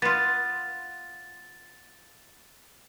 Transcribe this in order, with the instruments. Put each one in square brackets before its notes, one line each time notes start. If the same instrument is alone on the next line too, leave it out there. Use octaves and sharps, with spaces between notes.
[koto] B3 F4 [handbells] A6